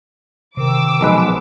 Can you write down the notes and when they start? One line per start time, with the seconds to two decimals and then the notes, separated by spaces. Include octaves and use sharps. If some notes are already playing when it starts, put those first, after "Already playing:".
0.57 C3 D#3 D6 E6
1.01 B1 F3 G#3 B4